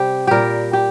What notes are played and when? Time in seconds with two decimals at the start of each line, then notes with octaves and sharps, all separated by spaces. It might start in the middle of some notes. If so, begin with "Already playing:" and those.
Already playing: C3 G3 G4
0.27 A#2 G3 G4 A#4
0.73 G4